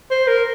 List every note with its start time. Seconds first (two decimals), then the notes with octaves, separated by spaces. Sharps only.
0.11 C5
0.28 A#4